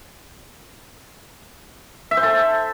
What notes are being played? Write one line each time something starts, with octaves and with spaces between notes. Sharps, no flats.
E5
C5
A4